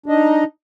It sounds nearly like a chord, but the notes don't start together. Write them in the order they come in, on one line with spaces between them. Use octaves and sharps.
D4 D#5 D#4